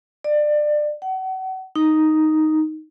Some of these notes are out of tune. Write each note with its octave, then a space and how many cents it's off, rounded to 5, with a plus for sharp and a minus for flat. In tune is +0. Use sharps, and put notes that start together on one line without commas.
D5 +25
F#5 +35
D#4 +0